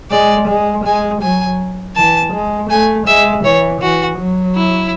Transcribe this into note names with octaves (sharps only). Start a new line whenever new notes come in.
G#3 D5
G#3
G#3 G#5
F#3 G#5
E3 A5
G#3
A3 G#5
G#3 E5
E3 C#5
E3 F#4
F#3
E4